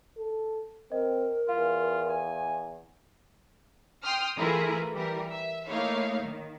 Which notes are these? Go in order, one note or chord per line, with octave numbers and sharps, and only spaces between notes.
A4
C4 A#4 D#5
E2 F4 F5
G#5
G5 C6 D#6 F6
E3 A3 E4 F4 G#4 A#4
E3 G3 G4 A#4
E5
A3 A#3 D#4 E4 C#5 F5
D#3